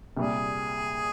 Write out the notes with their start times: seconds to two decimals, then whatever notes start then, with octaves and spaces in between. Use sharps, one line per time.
0.17 C2 A#2 G3 G#4